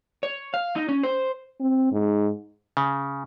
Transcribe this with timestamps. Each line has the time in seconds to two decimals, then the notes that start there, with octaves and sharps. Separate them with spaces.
0.23 C#5
0.54 F5
0.76 D#4
0.89 C#4
1.03 C5
1.60 C4
1.92 G#2
2.77 C#3